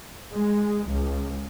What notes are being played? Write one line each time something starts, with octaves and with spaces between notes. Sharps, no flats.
G#3
C#2